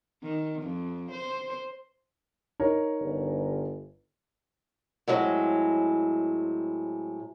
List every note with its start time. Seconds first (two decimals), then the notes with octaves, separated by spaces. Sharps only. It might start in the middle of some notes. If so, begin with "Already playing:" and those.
0.23 D#3
0.62 F2
1.11 C5
2.60 D#4 A#4 C#5
3.00 G1
5.08 A2 F#3 G#3 C4